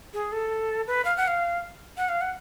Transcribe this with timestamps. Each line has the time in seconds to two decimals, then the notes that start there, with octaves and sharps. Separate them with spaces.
0.14 G#4
0.32 A4
0.87 B4
1.05 F5
1.17 F#5
1.27 F5
1.97 F#5
2.09 F5
2.21 F#5